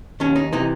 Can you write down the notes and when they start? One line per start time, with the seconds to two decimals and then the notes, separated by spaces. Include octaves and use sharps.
0.20 D#2 D#3 C#4
0.36 D#4
0.53 C3 E3 D#4